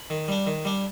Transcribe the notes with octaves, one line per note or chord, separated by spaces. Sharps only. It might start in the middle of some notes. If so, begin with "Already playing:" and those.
Already playing: B5
D#3
G3 D4
D#3
G3 D4